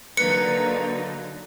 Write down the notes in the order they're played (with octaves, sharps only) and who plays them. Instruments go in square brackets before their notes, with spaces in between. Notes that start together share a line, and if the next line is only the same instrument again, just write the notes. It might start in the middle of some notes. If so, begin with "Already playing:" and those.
[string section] D3 F#3 D#4 [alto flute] A#3 [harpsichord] B4 [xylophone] C#7